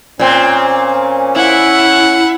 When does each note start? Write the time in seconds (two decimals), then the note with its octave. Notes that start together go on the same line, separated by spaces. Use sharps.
0.19 A#2 C4 C#4
1.36 E4 F#5